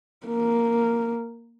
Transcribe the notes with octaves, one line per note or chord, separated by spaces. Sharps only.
A#3